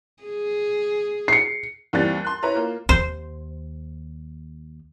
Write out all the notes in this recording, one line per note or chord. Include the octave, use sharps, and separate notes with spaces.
G#4
C7 C#7
D#2 E3 G3 C4 F#6 A6
C6 F#6
E4 B4 C#5 A#5
A#3 F4
D#2 C5